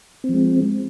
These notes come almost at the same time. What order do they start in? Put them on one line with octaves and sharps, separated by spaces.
C4 F3 G#3